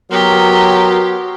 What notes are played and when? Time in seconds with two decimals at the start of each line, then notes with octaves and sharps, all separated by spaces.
0.11 F#3 B3 G4 A#4 C6